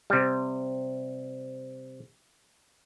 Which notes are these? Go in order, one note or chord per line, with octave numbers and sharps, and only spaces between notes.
C3 G3